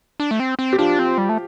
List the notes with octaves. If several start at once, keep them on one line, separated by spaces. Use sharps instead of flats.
D4
A3
C4
C4
G4
F3 D4 F4
C4
G3
A3